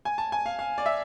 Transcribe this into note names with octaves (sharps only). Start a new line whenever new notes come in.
G#5
A5
G#5
F5
F5
D5
E5